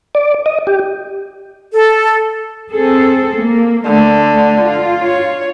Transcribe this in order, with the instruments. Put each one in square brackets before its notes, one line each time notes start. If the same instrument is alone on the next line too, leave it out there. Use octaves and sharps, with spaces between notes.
[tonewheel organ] D5
D#5
G4
[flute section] A4
[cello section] C4 G#4 A4
A#3
[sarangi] D3 [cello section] A3
[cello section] F4
[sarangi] C#5